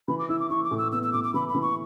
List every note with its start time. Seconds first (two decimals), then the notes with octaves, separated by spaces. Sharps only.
0.08 E3 B5
0.19 D6
0.29 E4 E6
0.40 D6
0.50 E4 C#6
0.64 D6
0.71 A2
0.78 E6
0.92 B3 E6
1.03 E6
1.13 A2 D6
1.24 D6
1.34 E3 B5
1.49 B5
1.55 E3
1.62 C#6